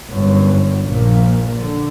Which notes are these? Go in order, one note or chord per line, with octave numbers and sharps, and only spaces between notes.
G1 F#2
A#1 A#2
D3